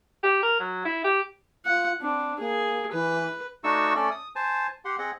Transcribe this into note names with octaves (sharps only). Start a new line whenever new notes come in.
G4
A#4
F#3
E4
G4
F4 F#5
C4 D4
A#3 G#4
E3 B4
A3 D4 D#4 F#4 C#6 E6
A3 C#4 A4 D5
D#6
C5 G#5 A5
G4 F#5 C6
C4 G#4 D#5 F#5